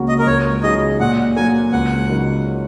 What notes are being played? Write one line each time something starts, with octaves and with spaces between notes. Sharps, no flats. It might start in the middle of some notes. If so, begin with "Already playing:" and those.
Already playing: C#2 C#3 A#3 F#4
D#5
A#4
C#2 C#5
C#3 F#3 D#4 G#4 D#5
A#2 F#5
F#3 A#3 G#5
C#2 F#5
C#3 F#3 D#4 A#4